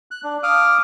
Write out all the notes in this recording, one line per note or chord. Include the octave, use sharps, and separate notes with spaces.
F#6
D4
F5 D6 D#6 F6